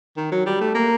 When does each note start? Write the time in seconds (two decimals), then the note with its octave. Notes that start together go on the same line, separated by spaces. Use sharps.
0.17 D#3
0.32 F#3
0.46 G3
0.61 A3
0.75 A#3